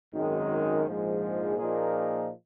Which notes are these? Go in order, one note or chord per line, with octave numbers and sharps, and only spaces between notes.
G#1 F#2 D#3 G#3
A#1 G#2 F3 G#3
A#2 F3 A#3 D#4 G#4